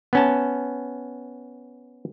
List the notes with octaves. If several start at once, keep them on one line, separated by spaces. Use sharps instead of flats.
B3 C#4 A5